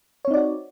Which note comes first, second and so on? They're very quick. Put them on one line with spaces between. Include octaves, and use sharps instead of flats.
C#5 C4 D#4 D5 F#4